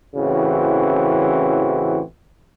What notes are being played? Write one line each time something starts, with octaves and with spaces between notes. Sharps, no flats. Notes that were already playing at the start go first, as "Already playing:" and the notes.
A1 C#3 E3 C4 F#4